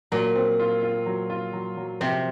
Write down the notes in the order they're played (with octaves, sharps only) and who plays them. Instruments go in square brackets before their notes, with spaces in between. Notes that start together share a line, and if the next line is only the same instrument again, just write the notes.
[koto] A#2 [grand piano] F#3
[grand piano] C4
F4
F4
F#3
F4
F#3
F#3
[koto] C3 [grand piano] F3